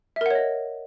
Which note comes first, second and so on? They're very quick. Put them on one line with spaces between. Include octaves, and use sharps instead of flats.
E5 A#4 F#5 C#5 D#5